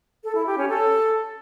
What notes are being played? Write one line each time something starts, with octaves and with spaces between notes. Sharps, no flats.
A4
E4
G4
C#4
A4